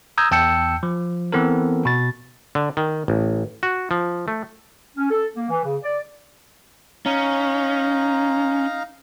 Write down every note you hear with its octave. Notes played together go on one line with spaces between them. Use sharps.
A#5 D#6 E6 G6 G#6
E2 G5 A5 E6 G6 C#7
F3
E3 B3 C4 A4 A#4
B2 A6
D3
D#3
A1
F#4
F3
A3
C#4
A4
A#3
E3
C#3
D5
C#4 D#4 F5 A#5